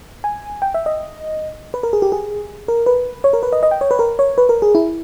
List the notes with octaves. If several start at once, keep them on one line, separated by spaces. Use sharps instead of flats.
G#5
G5
E5
D#5
B4
A#4
G#4
G4
G#4
A#4
B4
C#5
A#4
B4
D#5
D#5
G5
C#5
B4
A#4
C#5
B4
A#4
G#4
E4